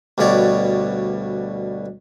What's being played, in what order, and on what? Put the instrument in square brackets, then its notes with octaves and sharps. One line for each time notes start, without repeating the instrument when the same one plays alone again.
[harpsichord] D2 G2 B2 C#5 D5